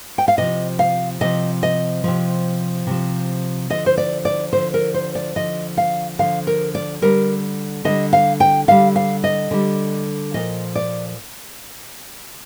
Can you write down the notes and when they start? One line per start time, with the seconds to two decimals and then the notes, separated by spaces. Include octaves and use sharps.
0.18 G5
0.28 F5
0.38 C3 F3 D#5
0.79 F5
1.21 C3 F3 D#5
1.63 D#5
2.04 C3 F3
2.87 C3 F3
3.70 D3 F3 D#5
3.86 C5
3.97 D5
4.25 D5
4.53 D3 F3 C5
4.74 A#4
4.94 C5
5.15 D5
5.36 D3 F3 D#5
5.77 F5
6.19 D3 F3 F5
6.47 A#4
6.75 D5
7.02 D3 G3 A#4
7.85 D3 G3 D#5
8.13 F5
8.40 G5
8.68 D3 G3 F5
8.96 F5
9.24 D#5
9.51 D3 G3
10.34 A#2 F3 D#5
10.75 D5